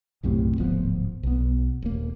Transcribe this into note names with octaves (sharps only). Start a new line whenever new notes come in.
B1 F#2 A2 C3
D1 G#1 F3 B3
B1 B3
D#1 A#3